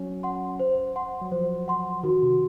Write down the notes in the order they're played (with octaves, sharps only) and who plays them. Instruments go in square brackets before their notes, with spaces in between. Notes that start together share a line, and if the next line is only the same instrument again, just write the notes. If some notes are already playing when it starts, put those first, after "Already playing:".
Already playing: [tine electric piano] F#3 C#4
[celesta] F#5 C6
C5
F#5 C6
[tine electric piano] F#3
[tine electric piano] F3 [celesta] C5
[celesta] F#5 C6
[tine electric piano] D#3 [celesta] F#4
[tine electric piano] C3